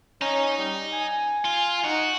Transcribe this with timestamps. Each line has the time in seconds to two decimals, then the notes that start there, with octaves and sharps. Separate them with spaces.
0.21 C#4 D#5 A#5
0.58 G3
0.93 G#5
1.45 F4
1.84 D#4 F#4